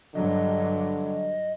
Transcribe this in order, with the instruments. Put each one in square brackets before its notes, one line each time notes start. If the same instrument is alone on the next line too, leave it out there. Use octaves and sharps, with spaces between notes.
[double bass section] G2 F#3 [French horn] D3 [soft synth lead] D#5